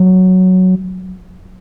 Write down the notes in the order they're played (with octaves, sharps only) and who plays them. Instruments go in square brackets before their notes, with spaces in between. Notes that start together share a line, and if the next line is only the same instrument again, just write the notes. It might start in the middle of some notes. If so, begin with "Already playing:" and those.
Already playing: [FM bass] F#3